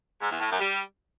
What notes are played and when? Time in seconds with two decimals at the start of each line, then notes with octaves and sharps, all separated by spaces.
0.21 G#2
0.30 E2
0.40 A2
0.50 F#2
0.59 G3